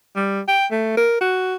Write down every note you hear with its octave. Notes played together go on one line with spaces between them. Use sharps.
G3
G5
A3
A#4
F#4